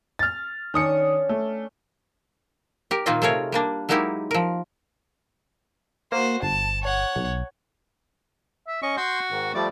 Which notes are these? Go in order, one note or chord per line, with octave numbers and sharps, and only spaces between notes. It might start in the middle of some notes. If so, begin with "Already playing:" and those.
F6 A6
D#3 C#4 D4 G#5 D#6 C#7
A3
G4 A#4
A#2 D#3 A#3 C4 F4 D#5
C3 A3 F4 G#4 A#4 C#5
G3 A#3 D4
F#3 G#3 A#3 D#4 E4 G4
F3 A#4
A#3 F#4 C5
G1 A5
C#5 F#5
B1
E5
C#4 D#5 C#6
F#4 C6 G6
G#2 D#3
F3 G3 A3 D5